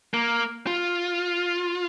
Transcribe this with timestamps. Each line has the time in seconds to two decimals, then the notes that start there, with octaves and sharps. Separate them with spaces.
0.14 A#3
0.67 F4